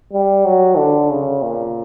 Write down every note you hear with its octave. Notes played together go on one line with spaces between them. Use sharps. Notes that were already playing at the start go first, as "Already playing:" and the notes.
G3
F#3
D3
C#3
A#2